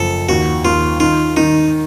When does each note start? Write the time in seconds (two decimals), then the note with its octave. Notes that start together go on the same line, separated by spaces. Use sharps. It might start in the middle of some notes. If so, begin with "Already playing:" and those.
Already playing: F#1 F3 A4
0.29 D#2 F#4
0.65 D#2 F4
1.00 D#3 F4
1.37 D#3 D#4